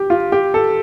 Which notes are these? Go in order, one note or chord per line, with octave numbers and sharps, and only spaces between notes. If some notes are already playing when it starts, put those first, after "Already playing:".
Already playing: G4
F4
G4
A4